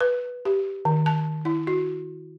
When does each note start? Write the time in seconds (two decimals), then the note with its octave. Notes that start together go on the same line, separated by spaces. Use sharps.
0.01 B4
0.45 G4
0.85 D#3
1.06 A5
1.45 E4
1.67 F#4